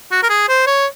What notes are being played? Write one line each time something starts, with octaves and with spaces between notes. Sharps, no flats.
F#4
A#4
G#4
C5
C#5